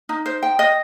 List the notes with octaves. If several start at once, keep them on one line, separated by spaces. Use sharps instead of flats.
D#4
C5
G5
D#5